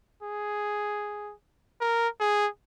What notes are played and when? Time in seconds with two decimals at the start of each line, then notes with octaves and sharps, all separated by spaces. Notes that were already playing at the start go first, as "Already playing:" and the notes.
0.23 G#4
1.81 A#4
2.20 G#4